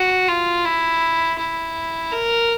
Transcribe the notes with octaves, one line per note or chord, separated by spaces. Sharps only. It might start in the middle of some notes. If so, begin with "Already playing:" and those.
Already playing: F#4
F4
E4
E4
A#4